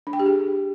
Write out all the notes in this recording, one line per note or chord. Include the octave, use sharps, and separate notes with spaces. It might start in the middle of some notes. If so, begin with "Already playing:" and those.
D4
G5
G4
G#4